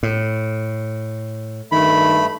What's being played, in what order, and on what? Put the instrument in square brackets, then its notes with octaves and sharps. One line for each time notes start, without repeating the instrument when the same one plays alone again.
[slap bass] A2
[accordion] G2 A3 [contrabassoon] D#3 [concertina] B5